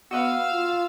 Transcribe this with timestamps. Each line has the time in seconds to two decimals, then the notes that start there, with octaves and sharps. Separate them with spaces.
0.11 B3 F#4 D#5 F5 F#5 E6
0.50 F4